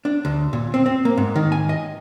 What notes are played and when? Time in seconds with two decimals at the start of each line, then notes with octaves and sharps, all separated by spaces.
0.05 D4
0.25 D2
0.53 A#2
0.74 C4
0.86 C4
1.05 A#3
1.18 G#2
1.36 D#3
1.52 G#5
1.69 D#5